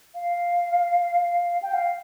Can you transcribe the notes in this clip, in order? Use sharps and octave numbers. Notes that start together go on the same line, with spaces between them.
F5
G5
F5